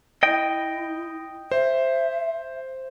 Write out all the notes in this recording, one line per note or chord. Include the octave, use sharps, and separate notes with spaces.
E4 D#5 G5
C5 E5